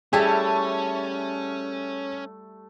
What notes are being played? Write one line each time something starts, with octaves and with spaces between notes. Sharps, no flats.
G3 A3 C#4 E4 G#4 A5